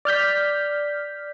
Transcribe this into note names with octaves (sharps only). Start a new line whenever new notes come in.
D5 F6 G6 B6